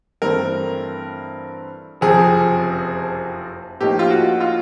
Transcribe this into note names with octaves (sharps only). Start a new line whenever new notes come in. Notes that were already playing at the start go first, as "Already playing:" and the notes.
G2 E3 A3 C4 A#4
F#1 F2 C3 F3 G#4
A2 F3 A#3 D#4 G4
F4
F#4
F4